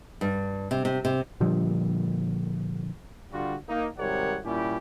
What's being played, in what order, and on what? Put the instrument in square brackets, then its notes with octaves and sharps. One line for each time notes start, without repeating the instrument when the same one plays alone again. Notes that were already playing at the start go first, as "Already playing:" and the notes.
[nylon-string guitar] G2
C3
C3
C3
[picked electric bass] A#2 D3 F3 G3
[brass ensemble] D3 G3 F4 F#4
A#3 D#4
G#1 C3 G3 A#4 C#5 F#5
A#2 G3 C#4 E4 G4